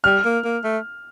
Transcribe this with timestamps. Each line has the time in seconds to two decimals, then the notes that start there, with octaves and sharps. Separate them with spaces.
0.04 G3 F6
0.25 A#3
0.44 A#3
0.64 A3